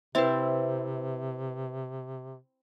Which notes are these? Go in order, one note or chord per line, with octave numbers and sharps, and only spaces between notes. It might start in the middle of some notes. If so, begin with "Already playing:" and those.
C3 C4 E4 B4 E5